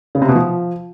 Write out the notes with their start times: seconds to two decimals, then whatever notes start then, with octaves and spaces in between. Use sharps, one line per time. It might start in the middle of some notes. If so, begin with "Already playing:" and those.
0.15 C#3
0.22 C3
0.28 B2
0.35 F3